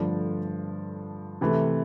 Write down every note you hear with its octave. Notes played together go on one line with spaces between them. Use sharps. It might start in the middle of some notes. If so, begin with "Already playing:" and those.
Already playing: G2 D3 F3 A3 D4
C3 E3 A3